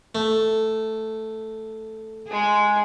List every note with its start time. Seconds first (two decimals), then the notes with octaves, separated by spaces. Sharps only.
0.15 A3
2.27 G#3 G#4